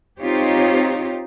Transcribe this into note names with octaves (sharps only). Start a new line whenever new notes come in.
C4 D#4 F4 G4 C5 C#5